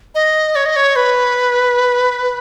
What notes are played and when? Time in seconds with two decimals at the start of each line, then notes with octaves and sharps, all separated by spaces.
0.15 D#5
0.56 C#5
0.66 D#5
0.76 C#5
0.96 B4